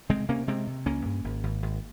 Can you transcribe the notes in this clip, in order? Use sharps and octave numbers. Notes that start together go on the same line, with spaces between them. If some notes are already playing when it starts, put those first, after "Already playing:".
C3 G#3 C4
C3 A#3 C#4
C3 G#3 C4
C3
C#2 A#3 C#4
G2
G#1
G#1
G#1